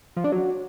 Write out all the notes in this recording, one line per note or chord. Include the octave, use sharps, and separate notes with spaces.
F3
D4
F#3